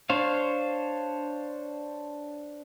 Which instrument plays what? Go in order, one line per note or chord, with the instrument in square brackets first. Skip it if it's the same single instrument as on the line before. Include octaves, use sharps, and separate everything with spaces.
[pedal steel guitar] D4 C5 C#5 F5